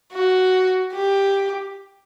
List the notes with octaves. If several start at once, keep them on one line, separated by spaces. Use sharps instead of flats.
F#4
G4